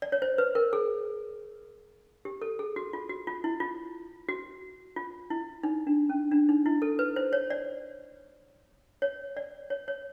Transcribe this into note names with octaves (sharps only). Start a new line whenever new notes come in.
D5
C#5
C5
B4
A#4
G#4
G4
A4
G#4
F#4
F4
F#4
F4
E4
F4
F#4
F4
E4
D#4
D4
C#4
D4
D#4
E4
A4
B4
C5
C#5
D5
C#5
D5
C#5
C#5